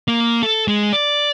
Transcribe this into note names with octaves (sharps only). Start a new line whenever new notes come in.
A#3
A4
G#3
D5